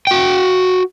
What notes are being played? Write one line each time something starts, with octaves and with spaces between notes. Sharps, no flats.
F#4 G5